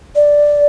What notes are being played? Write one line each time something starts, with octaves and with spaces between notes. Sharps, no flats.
D5